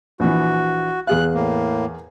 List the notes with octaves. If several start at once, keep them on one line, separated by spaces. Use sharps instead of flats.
A#1 E3 F#4
E2 G#4 F5 F#6
A2 A#3